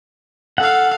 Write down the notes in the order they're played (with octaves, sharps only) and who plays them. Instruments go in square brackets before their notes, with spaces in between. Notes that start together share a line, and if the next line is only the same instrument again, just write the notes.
[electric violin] A4 F5 [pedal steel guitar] F#5